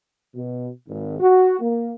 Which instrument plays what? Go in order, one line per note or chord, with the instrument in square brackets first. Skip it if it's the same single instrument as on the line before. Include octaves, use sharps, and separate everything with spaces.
[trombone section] B2
G#1
F#4
A#3